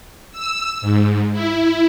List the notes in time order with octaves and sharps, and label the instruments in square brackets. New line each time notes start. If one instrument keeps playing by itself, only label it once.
[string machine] E6
G#2
E4